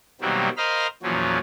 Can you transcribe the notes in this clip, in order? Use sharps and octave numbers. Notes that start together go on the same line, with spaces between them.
B2 D#3 F#3 G3 A#3 C4
A#4 C5 D#5 F5 B5 F6
E2 A#2 F3 F#3 C#4